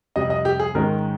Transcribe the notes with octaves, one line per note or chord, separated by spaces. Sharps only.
F2 C3 G3 D#5
D#5
G4
G#4
G#2 D#3 G#3 C#4 A#4